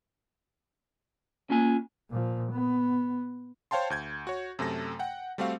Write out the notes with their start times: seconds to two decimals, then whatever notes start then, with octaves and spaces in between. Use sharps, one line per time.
1.50 A#3 C#4 F4 G#5
2.10 A#2 F3
2.52 B3
3.71 C5 C#5 F5 G5 A5 C6
3.90 D2 G6 G#6
4.27 F#4 C#5
4.59 F#2 C3 A3 A4 A#6
4.99 F#5 G5
5.38 G3 A3 C4 F#4 F5